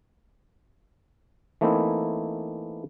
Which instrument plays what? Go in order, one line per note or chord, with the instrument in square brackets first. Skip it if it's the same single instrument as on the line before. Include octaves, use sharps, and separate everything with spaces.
[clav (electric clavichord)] E3 A3 A#3 C4 D#4 E4